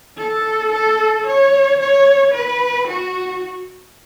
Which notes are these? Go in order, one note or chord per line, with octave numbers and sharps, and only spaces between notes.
A4
A4
C#5
C#5
B4
F#4